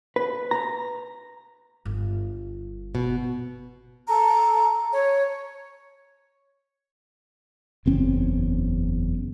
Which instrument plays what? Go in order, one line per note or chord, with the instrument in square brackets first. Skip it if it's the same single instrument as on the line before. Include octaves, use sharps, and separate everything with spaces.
[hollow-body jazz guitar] B4
A#5
[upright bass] G1
[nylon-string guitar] B2
[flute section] A4 A#5
C#5
[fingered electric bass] F#1 E2 C4 C#4